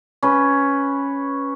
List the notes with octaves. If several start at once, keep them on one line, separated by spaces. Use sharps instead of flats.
C#4 B4